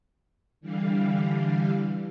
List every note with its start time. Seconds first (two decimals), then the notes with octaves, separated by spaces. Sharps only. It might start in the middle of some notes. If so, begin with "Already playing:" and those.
0.61 D3 E3 G3 F5